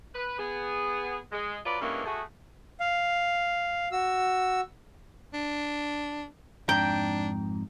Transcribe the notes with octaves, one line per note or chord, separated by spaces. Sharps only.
B4
B3 G#4
G#3
F#3 F4 B4 D5
G2 D3 E3 G#3 A#3 C#4
A3 F#4 G#4
F5
F#4 E6
D4
F2 G#2 D4 G5 A#5